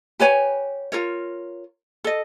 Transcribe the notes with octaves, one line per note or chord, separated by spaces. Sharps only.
G4 B4 C#5 G#5
F4 A#4 C#5
A4 D#5